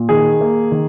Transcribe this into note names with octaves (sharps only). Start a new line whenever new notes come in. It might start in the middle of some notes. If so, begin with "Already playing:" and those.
Already playing: A#2
D#3 G#4
A#3
D#3